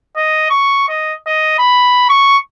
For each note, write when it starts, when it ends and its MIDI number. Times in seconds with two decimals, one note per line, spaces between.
0.16 0.47 75
0.50 0.88 85
0.89 1.14 75
1.26 1.55 75
1.59 2.08 83
2.09 2.37 85